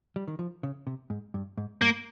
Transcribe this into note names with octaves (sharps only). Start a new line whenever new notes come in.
G3
D#3
F3
C#3
C3
G#2
G2
G#2
G2 A#3